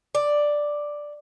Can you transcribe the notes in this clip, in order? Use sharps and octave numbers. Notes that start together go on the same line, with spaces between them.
D5